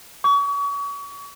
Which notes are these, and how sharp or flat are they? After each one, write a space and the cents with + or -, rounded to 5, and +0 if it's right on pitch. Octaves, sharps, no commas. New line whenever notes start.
C#6 +35